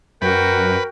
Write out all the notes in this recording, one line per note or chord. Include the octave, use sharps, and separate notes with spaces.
F#2 F#4 A#4 B4 G5